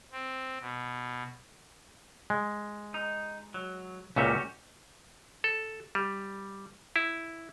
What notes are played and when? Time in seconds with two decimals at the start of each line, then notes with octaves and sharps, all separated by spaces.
0.12 C4
0.61 B2
2.30 G#3
2.94 D#4
3.54 F#3
4.16 C#2 A#2 C#4 F#4 G4 E5
5.44 A4
5.95 G3
6.96 E4